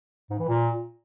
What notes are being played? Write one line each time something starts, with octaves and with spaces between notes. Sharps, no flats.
G#2
E3
A#2